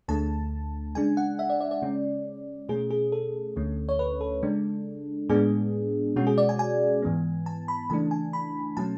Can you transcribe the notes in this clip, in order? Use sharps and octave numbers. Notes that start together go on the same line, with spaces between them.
D2 D3 A3 A5
C#3 G#3 D4 G#5
F#5
E5
D5
D5
D5
C#3 G#3 C#4
B2 A3 C#4 G#4
G#4
A4
D2 D3 A3 C#4
C#5
B4
A4
C#3 G#3 D4
A2 G#3 B3 D4 G#4
B2 G#3 C#4 F#4
G#4
D5
G#5
G#5
G#2 E3 B3
A5
B5
C#3 E3 A3 D4 A5
G#5
B5
B2 F#3 A3 C#4 A5